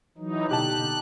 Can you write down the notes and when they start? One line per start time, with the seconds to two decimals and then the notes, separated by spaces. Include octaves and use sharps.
0.18 E3 F#3 D#4
0.49 B2 D3 D#4 G4 A5 F#6